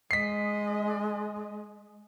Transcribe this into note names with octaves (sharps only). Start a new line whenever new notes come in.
G#3 D#5 B6 C7